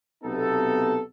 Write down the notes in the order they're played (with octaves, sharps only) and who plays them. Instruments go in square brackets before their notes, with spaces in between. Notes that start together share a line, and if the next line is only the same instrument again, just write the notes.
[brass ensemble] B1 C3 B3 D#4 A4